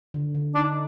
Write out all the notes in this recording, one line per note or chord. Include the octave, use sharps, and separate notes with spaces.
D3
D3
D4 D#4